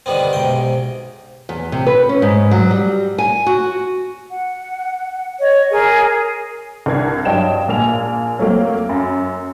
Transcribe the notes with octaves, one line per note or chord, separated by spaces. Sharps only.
D3 D#3 G3 B3 C4
B1 G#2 C3 G5
E2
C3
B4
C#4
G#2
F#3
G3
G#5
F#4
F#5
C#5 D#5
G#4 A#4 G#5
C2 D4 A#4 G#6
G2 F#3 D#5 G5 A5 E7
A#1 A#3 G#5 F7
F#3 A3 A#3 C4
F#2